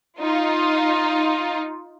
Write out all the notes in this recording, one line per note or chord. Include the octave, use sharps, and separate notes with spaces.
D#4 F4